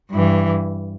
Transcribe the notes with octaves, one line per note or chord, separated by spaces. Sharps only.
G2 E3